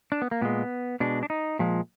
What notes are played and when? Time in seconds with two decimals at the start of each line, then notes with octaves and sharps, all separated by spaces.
0.12 D4
0.22 B3
0.31 A#3
0.41 A#2 G#3 B3
1.00 B2 G#3 D4
1.23 D4
1.30 D#4
1.59 A#2 F3 G#3